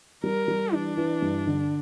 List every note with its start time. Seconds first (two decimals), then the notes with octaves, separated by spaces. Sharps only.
0.24 G3 A#4
0.48 G3
0.73 E3 D4
0.97 E3
1.22 G2
1.47 D3